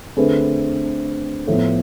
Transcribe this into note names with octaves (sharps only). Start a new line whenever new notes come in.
D3 A3 C4 G#4 B4
A2 F3 B3